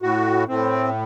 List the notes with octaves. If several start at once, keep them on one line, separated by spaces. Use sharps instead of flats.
A2 F#4
A2 C4